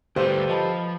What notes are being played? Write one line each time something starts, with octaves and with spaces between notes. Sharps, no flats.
D2 G3 G4 A4 B4 C5 F5
F3 D#5 A5 B5